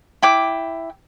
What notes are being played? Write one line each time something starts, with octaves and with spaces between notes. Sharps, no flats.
E4 G5 D6